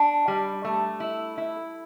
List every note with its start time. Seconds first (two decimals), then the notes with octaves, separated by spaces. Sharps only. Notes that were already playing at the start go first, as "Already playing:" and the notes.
Already playing: D4
0.28 G3
0.65 A3
1.00 E4
1.38 E4